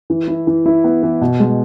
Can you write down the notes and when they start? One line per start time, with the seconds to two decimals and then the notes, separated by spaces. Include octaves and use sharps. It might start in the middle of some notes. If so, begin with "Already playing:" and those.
0.10 E3
0.28 E4
0.47 E3
0.66 E4
0.84 B3
1.03 E3
1.21 B2
1.40 G#3